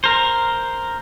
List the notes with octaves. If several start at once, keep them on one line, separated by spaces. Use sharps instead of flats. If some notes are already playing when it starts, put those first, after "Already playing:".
A#4 C5